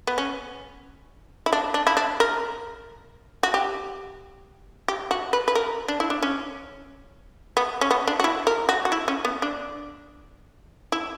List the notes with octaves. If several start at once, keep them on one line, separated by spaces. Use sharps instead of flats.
B3
C#4
E4
D4
D4
E4
D4
A#4
F#4
G4
G4
F#4
B4
B4
A#4
D4
E4
D4
C#4
B3
C#4
B3
D4
F#4
E4
A#4
F#4
F#4
E4
C#4
B3
D4
E4